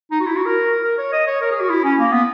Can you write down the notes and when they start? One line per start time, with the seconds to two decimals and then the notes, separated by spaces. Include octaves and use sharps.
0.11 D#4
0.20 F#4
0.27 E4
0.37 F#4
0.45 A#4
0.83 A#4
0.98 C#5
1.12 D#5
1.27 C#5
1.41 A#4
1.51 G#4
1.61 F#4
1.70 E4
1.84 C#4
1.99 A#3
2.12 B3